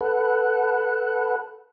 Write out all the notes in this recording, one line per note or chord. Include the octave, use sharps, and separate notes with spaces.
A4 B4 F#5